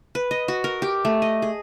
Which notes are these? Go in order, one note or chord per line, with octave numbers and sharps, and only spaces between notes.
B4
D#5
F#4
A#4
G4
A3
D#5
G#4